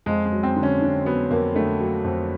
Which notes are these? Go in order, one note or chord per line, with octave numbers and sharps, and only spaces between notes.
F2 G#3
G#3
F#3
C4
D3
C#4
D3
F#3 B3
F2 A#3
D3 A3
F#3
F2